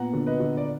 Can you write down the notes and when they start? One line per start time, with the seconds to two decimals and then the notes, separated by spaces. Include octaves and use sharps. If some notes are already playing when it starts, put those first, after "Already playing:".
Already playing: A#2 B3 F#5 A#5
0.13 D3
0.26 B4 D#5
0.40 D3
0.57 D5